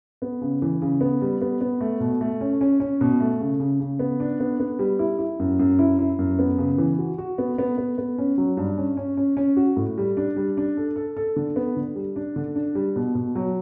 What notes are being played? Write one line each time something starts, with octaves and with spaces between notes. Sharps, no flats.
B3
C#3
E3
C#3
B3
G3
B3
B3
A3
B2
A3
C#4
C#4
C#4
B2
A3
C#3
C#3
C#3
B3
D4
B3
B3
G3
E4
E4
F#2
F#2
E4
E4
F#2
B3
C#3
E3
F#4
F#4
B3
B3
B3
B3
C#4
F#3
G2
C#4
C#4
C#4
C#4
F#4
A2
G3
D4
G3
D4
A4
A4
A4
D3
B3
D3
G3
D4
D3
D4
G3
B2
B2
F#3